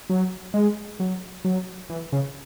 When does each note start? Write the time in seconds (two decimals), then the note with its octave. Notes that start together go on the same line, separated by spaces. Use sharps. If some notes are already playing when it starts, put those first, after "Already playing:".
0.10 F#3
0.54 G#3
1.00 F#3
1.45 F#3
1.90 E3
2.12 C#3